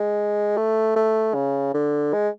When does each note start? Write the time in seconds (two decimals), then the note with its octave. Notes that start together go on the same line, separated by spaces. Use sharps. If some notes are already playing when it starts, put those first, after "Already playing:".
Already playing: G#3
0.57 A3
0.96 A3
1.34 C#3
1.74 D3
2.13 G#3